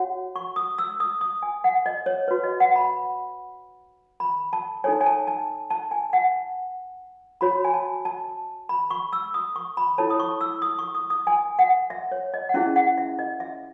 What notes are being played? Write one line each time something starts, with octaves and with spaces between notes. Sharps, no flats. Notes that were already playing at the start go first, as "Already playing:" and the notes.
Already playing: F#4 C#5 F#5
C#6
D#6
E6
D#6
D#6
G#5
F#5
D#5
C#5
F#4 B4 C#5
D#5
F#5
B5
B5
A5
D#4 A4 C#5 G#5
G#5
A5
A5
A5
G#5
F#5
F#4 C#5 B5
G#5
A5
A5
B5
C#6
E6
D#6
C#6
B5
E4 A4 C#5 A5
D#6
C#6
E6
D#6
C#6
D#6
D#6
G#5
F#5
E5
C#5
D#5
F#5
C#4 E4 G#4 E5
F#5
E5
D#5
E5